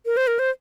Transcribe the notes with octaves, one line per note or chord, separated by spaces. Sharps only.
A#4
C5
A#4
C5